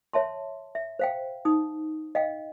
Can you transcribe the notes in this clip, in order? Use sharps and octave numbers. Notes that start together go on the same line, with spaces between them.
C#5 E5 A5 C6
E5
C5 F5 G5
D#4 D#6
D#5 F5 G5